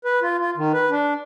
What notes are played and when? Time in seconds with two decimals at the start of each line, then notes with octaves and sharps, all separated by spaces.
0.05 B4
0.22 F4
0.40 F4
0.57 D#3
0.74 B4
0.90 D4